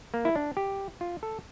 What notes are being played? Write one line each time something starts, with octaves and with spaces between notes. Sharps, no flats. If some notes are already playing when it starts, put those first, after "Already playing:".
A#3
E4
D4
G4
F4
A4